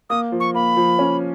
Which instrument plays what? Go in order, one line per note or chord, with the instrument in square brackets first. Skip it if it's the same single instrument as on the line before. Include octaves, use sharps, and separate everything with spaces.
[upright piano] A#3 [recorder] D#6
[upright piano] F3
[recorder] C#6
[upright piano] A#3 [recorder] B5
[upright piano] F3
C#4